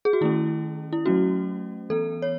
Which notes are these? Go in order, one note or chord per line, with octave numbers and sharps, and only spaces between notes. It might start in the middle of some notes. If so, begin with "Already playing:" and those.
G#4
F#4
D#3 A3 C#4 E4
E4
F#3 A3 C#4 F#4
E3 B3 A4
C#5